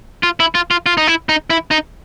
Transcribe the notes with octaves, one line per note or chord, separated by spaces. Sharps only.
F4
E4
F4
F4
F4
D#4
E4
D#4
E4
D#4